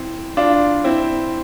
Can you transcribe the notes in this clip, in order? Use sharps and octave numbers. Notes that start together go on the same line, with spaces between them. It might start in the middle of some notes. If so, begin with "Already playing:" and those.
Already playing: C4 E4
D4 F4
C4 E4